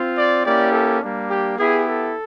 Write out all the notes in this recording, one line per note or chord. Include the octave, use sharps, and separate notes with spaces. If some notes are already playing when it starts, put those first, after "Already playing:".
Already playing: C4 F4
D5
A#3 C#4 E4 G4 D5
A4
G3 A#3 D4
G4
B3 E4 G4 G#4
A4